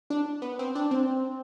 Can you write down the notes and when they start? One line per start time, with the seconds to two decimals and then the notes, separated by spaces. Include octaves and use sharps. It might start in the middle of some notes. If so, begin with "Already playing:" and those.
0.10 D4
0.42 B3
0.59 C4
0.75 D4
0.91 C4